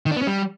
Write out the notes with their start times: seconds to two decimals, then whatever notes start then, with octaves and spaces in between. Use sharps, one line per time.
0.06 D#3
0.11 D4
0.16 B3
0.22 C#4
0.27 G3